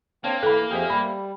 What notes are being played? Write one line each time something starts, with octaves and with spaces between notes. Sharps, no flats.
A#3 C4 D4 C#5
E3 A4 B4 B5
F2 G4 G#4 C5 E5 F6
G3 B5